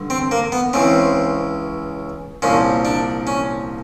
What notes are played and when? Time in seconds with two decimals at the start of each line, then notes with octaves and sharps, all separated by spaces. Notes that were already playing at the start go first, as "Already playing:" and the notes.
Already playing: G2 D3
0.10 C4
0.31 A#3
0.52 B3
0.73 C#2 C#3 E3 C4
2.42 C2 A#2 F3 C#4
2.85 D4
3.27 C#4